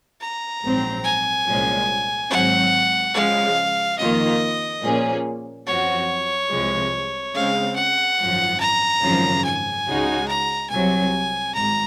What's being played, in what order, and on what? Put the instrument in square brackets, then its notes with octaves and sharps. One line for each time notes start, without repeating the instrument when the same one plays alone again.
[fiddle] A#5
[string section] A#1 G#2 F#3 C4
[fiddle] G#5
[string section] C2 A#2 F3 G#3 C#4
[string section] G#1 G#2 F#3 C4 [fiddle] F#5
[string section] C#3 F3 G#3 [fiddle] F5
[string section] F2 D#3 A#3 F4 [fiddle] D#5
[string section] A#2 F3 A#3 C#4 G#4
[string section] F#2 F3 C4 F#4 [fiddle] C#5
[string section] C2 C3 F3 G#3
[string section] C#3 G#3 C4 [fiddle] F5
[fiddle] F#5
[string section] G#1 F#2 F3
[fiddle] A#5
[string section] G#1 F#2 C#3 F3
[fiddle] G#5
[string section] C#2 C#3 G#3 D#4 F#4
[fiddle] A#5
[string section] C2 C3 F#3 [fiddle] G#5
[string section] G#1 G#2 [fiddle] A#5